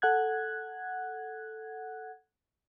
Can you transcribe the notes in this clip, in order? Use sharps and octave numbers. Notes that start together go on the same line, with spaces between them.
A4 F#5 F#6 G#6